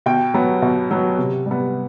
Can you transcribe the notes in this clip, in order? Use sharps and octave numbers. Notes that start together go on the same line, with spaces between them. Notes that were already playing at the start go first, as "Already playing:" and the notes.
B2 G5
F#3 B3
B2
F#3 B3
C3
G3 B3